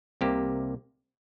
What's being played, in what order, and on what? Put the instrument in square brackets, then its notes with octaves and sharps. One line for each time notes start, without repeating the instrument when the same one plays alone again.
[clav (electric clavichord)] C2 C3 A#3 G4